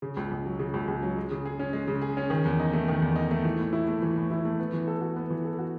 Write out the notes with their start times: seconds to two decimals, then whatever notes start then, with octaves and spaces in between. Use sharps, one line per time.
0.02 C#3
0.17 C#2
0.31 C#2
0.46 F#3
0.59 C#3
0.74 C#2
0.88 C#2
1.03 F#3
1.17 G#3
1.31 C#3
1.45 G#4
1.59 C#4
1.73 G#3
1.87 C#3
2.01 G#4
2.17 C#4
2.30 D#3
2.45 E2
2.60 D#4
2.73 A3
2.88 D#3
3.02 E2
3.16 D#4
3.31 A3
3.45 E3
3.59 A2
3.73 E4
3.87 A3
4.02 E3
4.16 A2
4.30 E4
4.45 A3
4.59 B3
4.73 E3
4.88 A4
5.01 F#4
5.16 B3
5.30 E3
5.45 A4
5.59 F#4